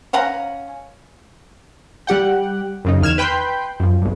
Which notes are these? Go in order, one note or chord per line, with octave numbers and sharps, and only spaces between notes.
C#4 F5 F#5 A#5
G3 G4 F#5 G5
F#2 C#3 D#4
E2 D#3 F6 G#6 E7
B4 G5 B5 C6 G6
F#2 F3
B1 G2